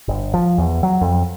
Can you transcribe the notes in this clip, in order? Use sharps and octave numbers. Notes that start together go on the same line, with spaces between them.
G1
F3
E2
F#3
F2